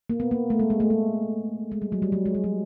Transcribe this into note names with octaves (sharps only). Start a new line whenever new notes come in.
A#3
B3
A#3
A3
G#3
G#3
A3
G#3
G#3
G3
F#3
G3
F#3
G#3
G3
F#3